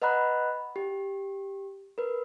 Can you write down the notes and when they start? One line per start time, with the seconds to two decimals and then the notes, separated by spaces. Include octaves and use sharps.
0.02 B4 D#5 F#5 A#5 B5 F#6
0.76 G4
1.98 A#4 B4